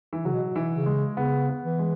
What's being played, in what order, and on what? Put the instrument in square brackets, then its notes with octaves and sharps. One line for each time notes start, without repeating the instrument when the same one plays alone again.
[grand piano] E3
[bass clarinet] C#3 [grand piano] F#3
[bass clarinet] B2
B2
[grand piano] E3
[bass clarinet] C#3
[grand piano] G#3
[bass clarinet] C#3 [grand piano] B3
[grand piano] B3
[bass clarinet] E3
[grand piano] G#3